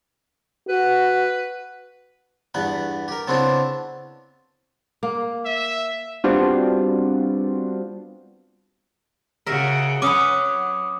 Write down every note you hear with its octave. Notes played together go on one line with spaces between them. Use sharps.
F#4 B4
E2 G2 B3 B4
G4 A#4
C#3 B3 C4 D4 E4
A#3
E5
G3 B3 C4 D4 F4 F#4
C#3 F#4 A#4 E5
F#3 C#4 B4 D6 D#6